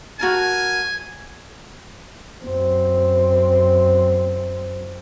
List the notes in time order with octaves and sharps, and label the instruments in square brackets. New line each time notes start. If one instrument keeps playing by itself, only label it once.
[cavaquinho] F#4 A#4 A5 [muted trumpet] G#5
[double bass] F#2 C4